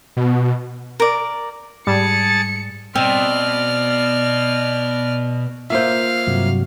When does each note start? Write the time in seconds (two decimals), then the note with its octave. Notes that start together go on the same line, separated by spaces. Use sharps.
0.17 B2
1.00 A#4 D5
1.87 G#2 G3 G#4 A5 A6 C#7
2.96 B2 C4 D5 F6
5.70 A#3 F4 C5 E5 F5
6.27 G2 C3 F#3